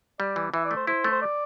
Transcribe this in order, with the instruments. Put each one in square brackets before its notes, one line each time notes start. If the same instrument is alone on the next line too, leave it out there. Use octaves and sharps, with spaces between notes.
[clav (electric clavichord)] G3 [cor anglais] D5
[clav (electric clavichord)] E3
[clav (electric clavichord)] E3 [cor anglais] E5
[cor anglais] D5
[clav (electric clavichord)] A3
[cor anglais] C5
[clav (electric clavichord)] E4 [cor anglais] C5
[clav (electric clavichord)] A3
[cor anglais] C5
D5